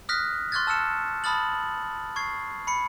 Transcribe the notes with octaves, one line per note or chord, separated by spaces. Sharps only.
D#6 F6 F#6 A#6 B6
C6 C#6 F6 F#6 G#6 A6
A5 E6 F6 C#7 E7
A5 B5 D#6 F6 A6 F#7
C#6 G#6 C7
B5 C#7